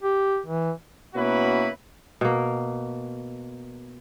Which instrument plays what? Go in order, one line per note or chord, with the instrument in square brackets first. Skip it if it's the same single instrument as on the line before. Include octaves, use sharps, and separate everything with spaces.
[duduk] G4
E3
[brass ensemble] B2 A#3 C#4 E4 F#4 B4
[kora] B2 A#3